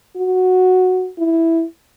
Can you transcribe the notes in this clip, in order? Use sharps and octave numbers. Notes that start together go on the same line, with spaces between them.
F#4
E4